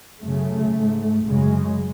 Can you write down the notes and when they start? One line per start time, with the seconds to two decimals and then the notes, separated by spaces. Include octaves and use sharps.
0.23 F#2 C#3 A3
0.75 G#2
1.27 F#2 C#3 G#3